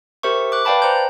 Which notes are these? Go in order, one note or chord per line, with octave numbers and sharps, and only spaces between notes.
G4 A#4 C5 E5 C#6
D6 F#6
B4 D5 F5 G5 A5 B5
C5 A#5 G6